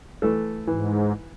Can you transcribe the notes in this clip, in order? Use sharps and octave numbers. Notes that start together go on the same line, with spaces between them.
E3 A3 A4
G#2 E3